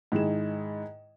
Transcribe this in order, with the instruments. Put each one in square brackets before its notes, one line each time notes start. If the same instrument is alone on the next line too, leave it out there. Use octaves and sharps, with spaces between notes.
[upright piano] G#2 D#3 E4 G#4 E7